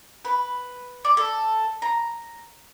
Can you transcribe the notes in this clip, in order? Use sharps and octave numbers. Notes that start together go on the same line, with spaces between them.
B4
D5
A4
A#5